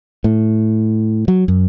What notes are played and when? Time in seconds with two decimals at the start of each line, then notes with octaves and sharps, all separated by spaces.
0.24 A2
1.28 F#3
1.48 F#2